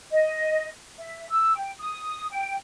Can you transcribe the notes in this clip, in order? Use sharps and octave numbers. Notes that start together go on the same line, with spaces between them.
D#5
E5
E6
G5
D#6
G5